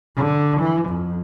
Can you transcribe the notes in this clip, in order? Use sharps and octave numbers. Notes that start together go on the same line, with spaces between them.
D3
E3
F2